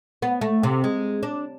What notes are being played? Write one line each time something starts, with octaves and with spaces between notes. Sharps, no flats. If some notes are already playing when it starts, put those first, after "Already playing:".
B3
A3
C3
G#3
D4